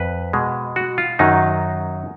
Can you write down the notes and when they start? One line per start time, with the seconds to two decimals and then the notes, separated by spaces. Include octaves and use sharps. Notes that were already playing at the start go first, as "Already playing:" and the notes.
Already playing: F2 B4
0.33 B2 G#3
0.76 F#4
0.98 F4
1.19 F#2 D#3 F#3 D#4